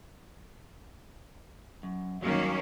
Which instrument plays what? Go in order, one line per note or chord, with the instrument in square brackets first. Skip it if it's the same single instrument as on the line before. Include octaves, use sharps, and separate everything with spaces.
[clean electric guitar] F#2
[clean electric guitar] G2 F#3 [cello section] D#3 A#3 C#4